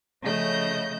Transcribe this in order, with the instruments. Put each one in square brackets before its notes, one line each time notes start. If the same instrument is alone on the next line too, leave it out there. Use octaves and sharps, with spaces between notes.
[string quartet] C#3 F3 A3 D#5 G6